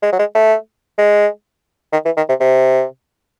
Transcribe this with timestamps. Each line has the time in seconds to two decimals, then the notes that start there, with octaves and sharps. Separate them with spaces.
0.03 G#3
0.13 F#3
0.19 G#3
0.35 A3
0.98 G#3
1.93 D#3
2.05 E3
2.17 D#3
2.29 C3
2.40 C3